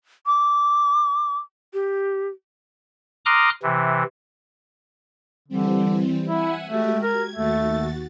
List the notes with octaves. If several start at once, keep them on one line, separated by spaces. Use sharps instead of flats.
D6
G4
A#5 C6 D6 D#6 F6 F#6
C3 E3
D3 E3 G3 C4
E4 E5 F#5 G#5
G#3 A3 F#4 G4
A#4 G#6
D#2 A3 F#4 A6